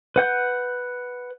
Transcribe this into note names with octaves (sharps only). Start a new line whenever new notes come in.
B4 F#5 G6